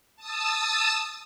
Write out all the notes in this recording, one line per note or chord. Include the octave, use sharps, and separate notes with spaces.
A5 D#6 E6